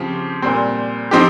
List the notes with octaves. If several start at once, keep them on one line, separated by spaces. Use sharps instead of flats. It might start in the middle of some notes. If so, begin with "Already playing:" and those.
Already playing: C#3 F3 C4 G4
A#2 G3 C4
F3 C4 D#4 G4